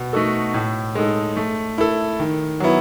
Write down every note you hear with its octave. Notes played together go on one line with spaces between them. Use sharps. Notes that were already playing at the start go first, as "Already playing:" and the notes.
Already playing: B2
A3 D#4 F#4 A4
A2
G#3 D#4 A4
A3
E4 A4
D#3
F#3 B3 E4